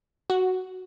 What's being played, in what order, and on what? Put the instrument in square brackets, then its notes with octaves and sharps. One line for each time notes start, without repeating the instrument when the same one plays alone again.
[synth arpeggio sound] F#4